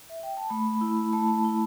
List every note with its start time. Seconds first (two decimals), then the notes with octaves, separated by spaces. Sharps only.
0.10 E5
0.23 G5
0.37 A5
0.49 A3 B5
0.81 E4
1.13 A3 A5
1.28 A5
1.44 E4 A5